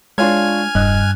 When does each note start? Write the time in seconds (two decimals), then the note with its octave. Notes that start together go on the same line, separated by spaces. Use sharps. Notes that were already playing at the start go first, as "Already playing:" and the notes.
0.18 G#3 D4 F4 C#5 G#5 F6 G#6
0.75 E1 G2 D#5 F#6